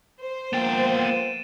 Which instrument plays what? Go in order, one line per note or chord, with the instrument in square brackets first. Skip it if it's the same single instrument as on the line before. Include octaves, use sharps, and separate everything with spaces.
[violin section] C5
[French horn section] F3 A#3 [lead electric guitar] B3 G5 [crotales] A6 D7
[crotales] D#7 E7